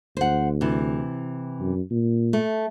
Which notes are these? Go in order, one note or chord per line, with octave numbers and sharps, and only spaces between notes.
D2 C5 F#5
C3 E3
F#2
A#2
A3